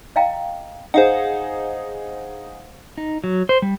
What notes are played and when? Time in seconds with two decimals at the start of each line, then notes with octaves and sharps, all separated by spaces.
0.16 D#5 F5 G5 A#5
0.94 D#4 G#4 C5 F5 F#5
2.98 D#4
3.24 F#3
3.49 C5
3.62 G3